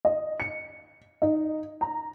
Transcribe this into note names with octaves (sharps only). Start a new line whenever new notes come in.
D#5
C#7
D#4
A#5